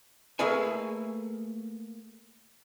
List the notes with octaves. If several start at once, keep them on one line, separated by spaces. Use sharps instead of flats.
A3 A#3 G#4 A4 B4 G#5